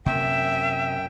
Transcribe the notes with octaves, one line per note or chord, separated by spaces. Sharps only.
F#2 C3 A#3 E5 G5